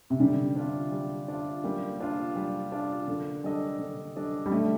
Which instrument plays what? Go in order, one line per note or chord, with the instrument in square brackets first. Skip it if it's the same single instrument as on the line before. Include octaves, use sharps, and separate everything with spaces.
[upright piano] C3
[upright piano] D3 [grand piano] G3
[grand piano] D4 F4
G3
D4 F4
[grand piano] G3 [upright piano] A#3
[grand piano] D4 F4
G3
D4 F4
D3
G3 D4 A4 D#5
D3
G3 D4 A4 D#5
[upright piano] G3
[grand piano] D3 [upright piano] A3